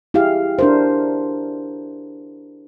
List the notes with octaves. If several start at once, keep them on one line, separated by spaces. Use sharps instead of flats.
E4 G4 G#4 F5
D4 A#4 C5